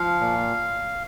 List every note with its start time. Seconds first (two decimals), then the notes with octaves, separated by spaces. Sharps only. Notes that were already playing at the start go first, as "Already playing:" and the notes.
Already playing: F3 F5
0.20 A#2